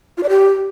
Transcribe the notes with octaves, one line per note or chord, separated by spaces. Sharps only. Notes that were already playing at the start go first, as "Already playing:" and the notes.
F4
D5
G4